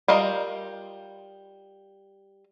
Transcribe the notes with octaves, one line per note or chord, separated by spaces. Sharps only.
G3 F4 A#4 D#5